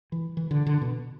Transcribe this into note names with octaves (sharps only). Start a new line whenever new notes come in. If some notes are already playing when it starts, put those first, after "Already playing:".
E3
E3
D3
D3
B2